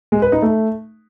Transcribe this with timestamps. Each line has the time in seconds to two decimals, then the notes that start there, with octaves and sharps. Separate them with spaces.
0.12 G#3
0.22 B4
0.32 D#4
0.42 A3